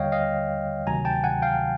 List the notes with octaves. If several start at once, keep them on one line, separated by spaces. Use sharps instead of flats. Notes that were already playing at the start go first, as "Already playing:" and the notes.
Already playing: D#2 D3 G3 C#5 D#5 F5 G5
D#5 F5
D2 C3 D#3 F#3 G#5 A#5
G5 A5
F#5 G#5
F5 G5